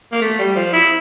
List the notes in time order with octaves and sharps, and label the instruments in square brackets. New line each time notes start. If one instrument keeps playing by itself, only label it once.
[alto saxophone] A#3
A3
G3
F3
E4